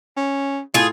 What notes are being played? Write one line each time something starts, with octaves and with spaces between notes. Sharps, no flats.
C#4
A2 F4 G#4